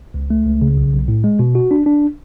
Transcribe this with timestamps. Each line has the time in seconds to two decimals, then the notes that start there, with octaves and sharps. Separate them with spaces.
0.14 C#2
0.30 A3
0.46 C#2
0.62 C#3
0.77 B1
0.93 B1
1.08 A2
1.24 G#3
1.39 B2
1.55 F#4
1.71 D4
1.86 D4